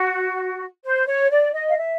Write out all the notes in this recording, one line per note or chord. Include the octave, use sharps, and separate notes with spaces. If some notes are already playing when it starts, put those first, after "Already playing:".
Already playing: F#4
C5
C#5
D5
D#5
F5
E5